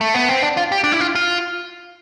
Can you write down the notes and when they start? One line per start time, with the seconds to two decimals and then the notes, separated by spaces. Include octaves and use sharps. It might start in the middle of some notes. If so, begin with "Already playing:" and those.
0.01 A3
0.14 B3
0.29 C4
0.42 D4
0.57 F4
0.72 G4
0.84 D4
0.92 E4
1.01 F4
1.15 F4